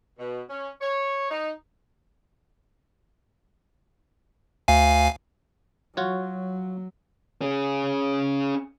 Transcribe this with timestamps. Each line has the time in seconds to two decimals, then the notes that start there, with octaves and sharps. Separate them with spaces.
0.19 B2
0.49 C#4
0.81 C#5
1.30 D#4
4.68 D2 F5 G#5
5.97 F#3 F4 F#4 C#5
7.42 C#4 G#4